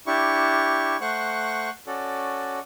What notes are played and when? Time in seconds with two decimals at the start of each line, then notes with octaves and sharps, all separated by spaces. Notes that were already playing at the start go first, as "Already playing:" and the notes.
0.07 D4 E4 G4 C#6
1.01 A3 C5 F#5 C#6 F#6
1.87 C#4 F#4 A4 D5